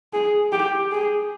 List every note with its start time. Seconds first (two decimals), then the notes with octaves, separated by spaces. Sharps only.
0.13 G#4
0.52 G4
0.92 G#4